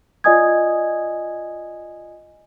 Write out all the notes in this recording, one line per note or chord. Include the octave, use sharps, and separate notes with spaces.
F4 D5 D#5 G#5 D#6 G#6